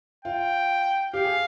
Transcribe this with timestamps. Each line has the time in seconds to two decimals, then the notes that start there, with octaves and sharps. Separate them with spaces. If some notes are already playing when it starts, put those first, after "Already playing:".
0.25 F4 G5
1.14 G4 F5
1.25 G#4